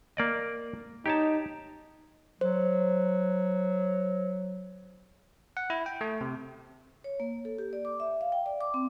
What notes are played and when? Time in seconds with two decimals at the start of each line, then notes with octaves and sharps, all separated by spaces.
0.17 A#3 D5 D#5
1.06 D#4 G4 C#5 A5
2.41 F#3 C5
5.57 F#5
5.70 E4
5.86 G5
6.01 A3
6.21 C3
7.04 C#5
7.20 A#3
7.45 A4
7.58 G4
7.73 D5
7.85 D6
8.00 E5
8.21 F5
8.32 G5
8.46 D5
8.61 D6
8.74 C4